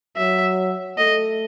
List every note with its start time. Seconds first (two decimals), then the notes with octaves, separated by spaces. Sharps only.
0.17 F#3 E5
0.98 A3 D#5